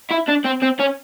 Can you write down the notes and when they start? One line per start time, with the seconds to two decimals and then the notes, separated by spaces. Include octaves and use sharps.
0.11 E4
0.29 D4
0.45 C4
0.63 C4
0.80 C#4